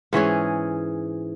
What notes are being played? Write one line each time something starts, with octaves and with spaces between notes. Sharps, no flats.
G#2 E3 C#4 G#4